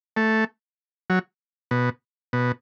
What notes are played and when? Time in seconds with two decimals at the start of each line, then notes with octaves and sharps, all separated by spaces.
0.17 A3
1.10 F#3
1.71 B2
2.33 B2